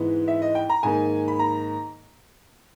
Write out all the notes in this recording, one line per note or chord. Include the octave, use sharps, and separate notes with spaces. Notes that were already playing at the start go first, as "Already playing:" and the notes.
Already playing: G#2 E3 G#3 B3
E5
D#5
G5
A#5
G#2 D#3 A#3 G#5
B5
A#5